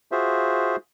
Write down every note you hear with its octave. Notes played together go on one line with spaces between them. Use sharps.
F4 F#4 G#4 C5 E5